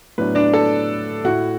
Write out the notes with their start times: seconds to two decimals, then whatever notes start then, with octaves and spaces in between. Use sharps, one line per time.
0.18 A2 F#3 B3 D4 B4
0.35 D4 D5
0.53 A4 A5
1.24 A2 A3 E4 F#4 F#5